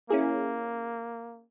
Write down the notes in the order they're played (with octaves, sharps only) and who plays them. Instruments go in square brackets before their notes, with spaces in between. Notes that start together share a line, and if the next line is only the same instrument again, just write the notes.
[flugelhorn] A#3 [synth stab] C#4 E4 G#4